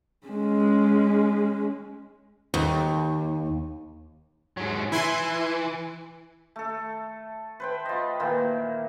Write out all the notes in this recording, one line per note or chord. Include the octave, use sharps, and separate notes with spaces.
G#3 C#4
D#2
G#2 F#3
E3 E4 G#5 C6
A3 A4
B4 C5 G5
F4 D#5
A#2 D#3 E3 A#3